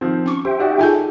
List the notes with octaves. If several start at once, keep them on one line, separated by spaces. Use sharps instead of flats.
D#3 F3 C4
C#4 C#6 D6
G4 C5 E5 G5
D#4 F#4 D5
D#4 F4 G#4 A4 G#5 G6